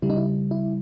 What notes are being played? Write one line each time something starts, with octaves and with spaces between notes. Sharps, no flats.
C#3 G3 E4
D#4
E4
E4